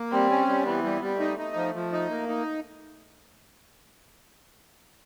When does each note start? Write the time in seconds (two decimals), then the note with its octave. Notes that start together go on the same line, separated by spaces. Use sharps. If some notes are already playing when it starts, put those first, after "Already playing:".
Already playing: A#3
0.12 G3 C4
0.30 C#4
0.47 G3
0.66 E3 B3
0.84 G3
1.02 G3
1.20 A3 D#4
1.38 D#4
1.55 F3
1.75 F3
1.92 D#4
2.10 A#3
2.28 D#4